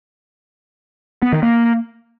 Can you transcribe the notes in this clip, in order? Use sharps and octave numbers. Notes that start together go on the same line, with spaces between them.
B3
D#3
A#3